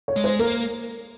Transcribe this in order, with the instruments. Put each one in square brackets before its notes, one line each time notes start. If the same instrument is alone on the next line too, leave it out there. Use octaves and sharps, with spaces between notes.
[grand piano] C#5
[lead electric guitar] G#3
[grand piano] C5
[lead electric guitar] A#3 [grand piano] A#4